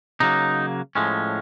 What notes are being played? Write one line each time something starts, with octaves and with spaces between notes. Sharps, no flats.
C#3 F#3 A#3 D#4
A2 F3 G#3 C#4